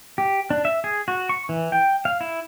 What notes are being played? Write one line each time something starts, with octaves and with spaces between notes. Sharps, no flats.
G4
D4
E5
G#4
F#4
C#6
E3
G5
F5
E4